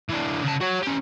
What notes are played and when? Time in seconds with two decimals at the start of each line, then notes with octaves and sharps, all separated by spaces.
0.09 E3 D4
0.43 C#3 A5
0.61 F#4 C#5
0.83 C#4 G4